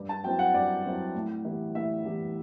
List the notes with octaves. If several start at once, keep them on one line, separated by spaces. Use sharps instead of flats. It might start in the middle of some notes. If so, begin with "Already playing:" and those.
Already playing: G2
A5
F#3 C4 E4 G5
F#5
G2 D5
F#3 C4 E4
A2
E3 G3 B3 E4
A2 E5
E3 G3 B3 E4